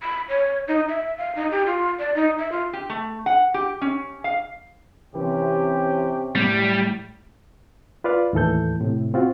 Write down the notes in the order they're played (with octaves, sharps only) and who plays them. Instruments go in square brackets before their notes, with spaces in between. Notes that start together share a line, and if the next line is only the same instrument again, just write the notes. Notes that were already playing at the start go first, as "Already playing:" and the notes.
[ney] B5
C#5
D#4
E5
F5
D#4
G4
F4
D5
D#4
E5
F4
[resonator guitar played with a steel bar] G4
A3
F#5
G4
C#4
F5
[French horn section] C3 C#4 [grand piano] E3 [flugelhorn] G4
[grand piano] A2 G#6 [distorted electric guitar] G3
[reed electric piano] F4 B4 D5 F5
D#2 A2 E3 A4 G6
A2 C3
C4 F4 F#4